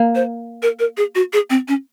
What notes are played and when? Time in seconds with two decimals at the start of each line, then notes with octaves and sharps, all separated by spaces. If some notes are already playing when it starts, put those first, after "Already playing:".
Already playing: A#3
0.15 C5
0.62 A#4
0.79 A#4
0.97 G#4
1.15 F#4
1.33 G#4
1.50 C4
1.68 C#4